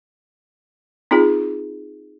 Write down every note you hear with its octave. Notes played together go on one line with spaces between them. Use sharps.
C4 D#4 F4 G#4